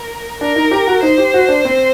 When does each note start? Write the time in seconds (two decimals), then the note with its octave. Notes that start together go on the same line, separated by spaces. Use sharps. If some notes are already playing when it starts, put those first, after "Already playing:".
Already playing: A#4
0.41 D4 A#4
0.56 D#4
0.71 G4
0.87 F#4
1.03 D#4 C5
1.18 G4
1.34 F#4
1.49 D4
1.65 C4